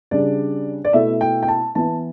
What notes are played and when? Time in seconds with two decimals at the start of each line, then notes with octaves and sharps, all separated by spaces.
0.11 C#3 G3 D4 D5
0.85 D5
0.93 B2 A3 E4 E5
1.21 G5
1.43 G5
1.48 A5
1.75 E3 B3 E4 A5